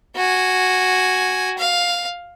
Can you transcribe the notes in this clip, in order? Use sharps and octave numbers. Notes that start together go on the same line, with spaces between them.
F#4 G#5
F5